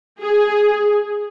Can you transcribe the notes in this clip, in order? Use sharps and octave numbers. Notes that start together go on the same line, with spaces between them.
G#4